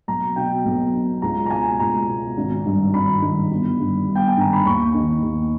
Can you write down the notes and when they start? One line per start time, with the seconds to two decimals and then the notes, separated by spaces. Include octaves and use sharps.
0.08 B1 A#5
0.36 B2 G5
0.65 B1
0.94 B2
1.22 C#2 A#5
1.46 A#5
1.50 B2 G#5
1.79 C#2 A#5
2.08 B2
2.37 G#1
2.66 G2 D#3
2.94 G#1 B5
3.22 G2 D#3
3.51 G1
3.80 G2 D#3
4.08 G1
4.15 G5
4.28 G#5
4.37 G2 D#3 A#5
4.53 B5
4.65 D#2 C#6
4.94 D#3
5.22 D#2